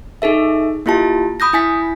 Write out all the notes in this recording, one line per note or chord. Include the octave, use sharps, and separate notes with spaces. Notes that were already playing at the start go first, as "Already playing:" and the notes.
D#4 G#4 A4 E5
A#3 E4 F4 G4 A5
B5 D#6 G6 A#6
E4 G#5 B6